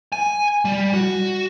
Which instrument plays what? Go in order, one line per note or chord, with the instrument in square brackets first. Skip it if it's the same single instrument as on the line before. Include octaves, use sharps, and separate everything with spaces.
[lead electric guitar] G#5
G3
F#4